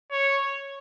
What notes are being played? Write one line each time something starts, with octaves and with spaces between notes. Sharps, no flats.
C#5